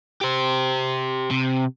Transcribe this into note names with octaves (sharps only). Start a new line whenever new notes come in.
G4 C5
C3